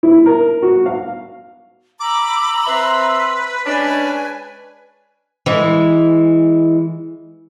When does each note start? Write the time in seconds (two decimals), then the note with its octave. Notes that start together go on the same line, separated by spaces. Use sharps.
0.03 E4
0.26 A#4
0.62 F#4
0.86 F5
2.00 A#5 B5 D6 E6
2.67 C4 B4 E5 C6
3.65 G#3 C#4 D4 G#5
5.46 E3 G#3